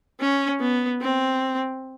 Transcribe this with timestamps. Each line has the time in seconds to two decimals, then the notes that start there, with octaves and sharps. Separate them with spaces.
0.20 C#4
0.60 B3
1.01 C4